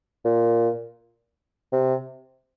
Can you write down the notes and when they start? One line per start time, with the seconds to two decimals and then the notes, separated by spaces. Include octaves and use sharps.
0.25 A#2
1.72 C3